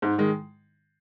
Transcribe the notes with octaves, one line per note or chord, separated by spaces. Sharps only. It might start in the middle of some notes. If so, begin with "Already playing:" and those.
G#2
D#3 G#3